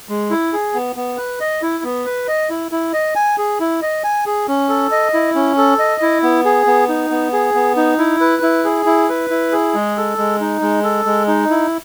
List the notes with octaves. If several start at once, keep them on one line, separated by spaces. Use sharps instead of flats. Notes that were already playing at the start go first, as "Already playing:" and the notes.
G#3
E4
G#4
B3
B3
B4
D#5
E4
B3
B4
D#5
E4
E4
D#5
G#5
G#4
E4
D#5
G#5
G#4
C#4
A4
D#5
E4
C#4
A4
D#5
E4
B3
G#4
B3
D#4
B3
G#4
B3
D#4
E4
B4
E4
G#4
E4
B4
E4
G#4
G#3
A4
G#3
D#4
G#3
A4
G#3
D#4
E4